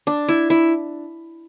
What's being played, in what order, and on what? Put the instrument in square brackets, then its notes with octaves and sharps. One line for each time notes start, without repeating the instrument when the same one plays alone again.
[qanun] D4
E4
E4